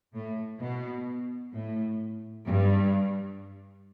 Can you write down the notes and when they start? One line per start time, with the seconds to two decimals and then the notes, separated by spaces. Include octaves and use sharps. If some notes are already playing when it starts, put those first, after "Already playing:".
0.14 A2
0.60 B2
1.53 A2
2.45 G2